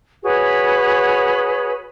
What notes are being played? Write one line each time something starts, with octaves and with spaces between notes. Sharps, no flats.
F#4 G#4 B4 C#5